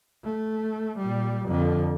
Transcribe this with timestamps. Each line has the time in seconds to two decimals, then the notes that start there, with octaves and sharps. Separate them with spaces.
0.25 A3
0.98 A#2 G3
1.47 F2 D3